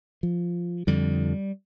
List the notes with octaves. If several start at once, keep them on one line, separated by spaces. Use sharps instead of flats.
F3
F2 D3 G3